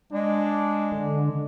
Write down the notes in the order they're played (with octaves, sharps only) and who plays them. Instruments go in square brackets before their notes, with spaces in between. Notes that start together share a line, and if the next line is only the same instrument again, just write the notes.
[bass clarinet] G#3 [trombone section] D4
[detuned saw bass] D3